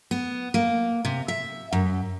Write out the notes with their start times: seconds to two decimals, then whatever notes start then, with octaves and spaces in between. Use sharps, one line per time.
0.11 B3
0.54 A#3
1.05 C3
1.28 E5
1.73 F#2